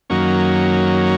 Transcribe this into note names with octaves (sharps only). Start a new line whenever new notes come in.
F#2 D#3 F#3 A#3 C#4